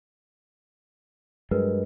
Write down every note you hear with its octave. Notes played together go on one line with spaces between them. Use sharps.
G2 F#3 G#3 A#4 B4 D#5